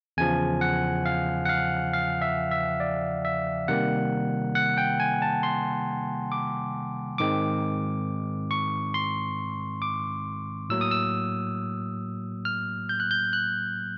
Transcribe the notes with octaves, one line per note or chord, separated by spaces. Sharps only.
E2 C#3 F3 G#5
F#5
F5
F#5
F5
F5
E5
E5
D5
E5
C3 D#3 G3 A#3 F#5
F#5
G5
G#5
A5
C6
D6
G#2 D#3 G#3 C4 D6
C#6
C6
D6
A2 F#3 A#3 E6
D#6
E6
F6
G6
F#6
G6
F#6